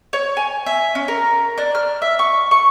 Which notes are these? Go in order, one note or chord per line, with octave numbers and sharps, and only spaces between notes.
C#5
G#5
E5
C#4
A#4
D4
F6
E5
C#6
C#6